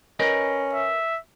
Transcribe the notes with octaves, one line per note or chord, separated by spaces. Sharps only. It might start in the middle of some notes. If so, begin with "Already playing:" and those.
C#4 A#4 B4 D#5
E5